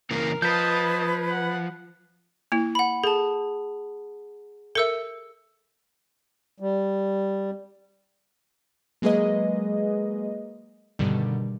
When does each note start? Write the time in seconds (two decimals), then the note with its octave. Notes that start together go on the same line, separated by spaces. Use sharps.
0.11 C#3 E3 A#3 A#4
0.42 F3 B4 D#5 A5 B5 G6 G#6 B6
1.30 F#5
2.52 A#3 E4
2.75 F#5 B5
3.04 G#4 A4 A5
4.75 A4 A#4 E5 E6 C#7
6.60 G3
9.02 F#3 G#3 A#3 G#4 B4 D#5
10.99 G2 B2 D3 D#3 G3